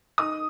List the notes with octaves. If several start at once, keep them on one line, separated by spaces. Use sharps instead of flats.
D#4 D#6